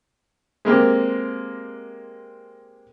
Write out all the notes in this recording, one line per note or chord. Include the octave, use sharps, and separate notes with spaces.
G#3 A#3 C4 G4